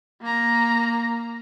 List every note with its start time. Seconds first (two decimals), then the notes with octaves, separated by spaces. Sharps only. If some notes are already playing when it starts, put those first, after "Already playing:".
0.22 A#3 A#5